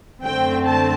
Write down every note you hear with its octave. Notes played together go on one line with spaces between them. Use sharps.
F#2 D3 A3 C4 G5
A5